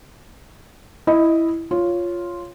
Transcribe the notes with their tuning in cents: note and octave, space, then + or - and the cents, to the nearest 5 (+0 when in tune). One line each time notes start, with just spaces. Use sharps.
E4 +0 D#5 +0
F4 +0 C#5 +0